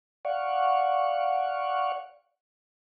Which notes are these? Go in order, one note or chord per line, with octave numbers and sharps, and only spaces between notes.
D5 F5 F#5 C#6